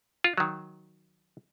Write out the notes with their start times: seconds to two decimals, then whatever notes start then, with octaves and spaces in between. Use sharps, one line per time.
0.24 F4
0.38 D#3 F#3